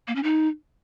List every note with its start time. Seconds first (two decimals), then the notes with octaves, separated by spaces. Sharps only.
0.08 A#3
0.15 C#4
0.23 D#4